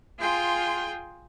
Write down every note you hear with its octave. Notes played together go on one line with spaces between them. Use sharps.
F4 G#4 G5 G#5 C6